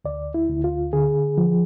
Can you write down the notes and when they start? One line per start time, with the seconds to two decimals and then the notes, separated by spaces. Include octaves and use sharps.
0.05 D2 D5
0.34 E4
0.49 D2
0.64 F4
0.93 D3 G#4
1.38 F3